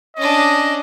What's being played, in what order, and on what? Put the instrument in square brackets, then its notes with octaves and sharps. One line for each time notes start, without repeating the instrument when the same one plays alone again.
[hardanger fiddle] C#4 D4 [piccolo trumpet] D#5